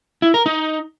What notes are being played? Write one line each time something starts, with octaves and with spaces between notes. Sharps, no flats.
E4
A#4
D#4